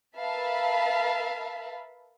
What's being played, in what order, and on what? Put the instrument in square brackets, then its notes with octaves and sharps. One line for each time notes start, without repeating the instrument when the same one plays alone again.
[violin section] A#4 B4 E5 F5 A5 B5